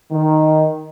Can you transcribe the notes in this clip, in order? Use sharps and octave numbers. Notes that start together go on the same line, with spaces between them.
D#3